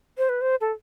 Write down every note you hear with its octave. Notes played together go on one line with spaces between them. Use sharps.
C5
B4
C5
A4